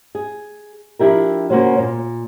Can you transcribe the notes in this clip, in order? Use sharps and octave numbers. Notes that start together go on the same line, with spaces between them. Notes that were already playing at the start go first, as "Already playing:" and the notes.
G#4
F3 D4 E4 G4 A#4
C#3 A#3 C#4 F#4 C5 C#5
A#2